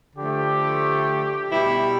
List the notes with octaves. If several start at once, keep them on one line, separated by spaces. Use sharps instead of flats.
D3 F3 A3 G4
B2 G3 E4